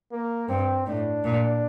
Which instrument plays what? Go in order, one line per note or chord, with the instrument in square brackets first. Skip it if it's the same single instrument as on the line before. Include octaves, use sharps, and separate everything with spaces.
[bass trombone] A#3
[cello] G2 [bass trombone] C4
[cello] A2 [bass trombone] D4
[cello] A#2